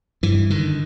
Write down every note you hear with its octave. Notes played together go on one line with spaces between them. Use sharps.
G2 E3
D3 D#3